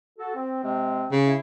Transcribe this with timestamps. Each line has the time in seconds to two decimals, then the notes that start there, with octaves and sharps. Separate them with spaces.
0.19 F#4 A4
0.35 C4
0.63 C3 G#3 C4
1.12 C#3
1.25 E4